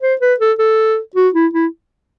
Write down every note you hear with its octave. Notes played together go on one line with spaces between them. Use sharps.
C5
B4
A4
A4
F#4
E4
E4